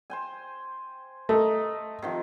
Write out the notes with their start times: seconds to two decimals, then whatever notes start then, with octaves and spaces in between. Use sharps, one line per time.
0.10 C5 G5 G#5
1.29 A3 D#5 A#5
2.02 C3 D#3 F3